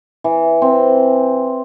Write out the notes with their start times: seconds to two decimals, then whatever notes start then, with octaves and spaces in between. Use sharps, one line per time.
0.24 E3
0.62 C4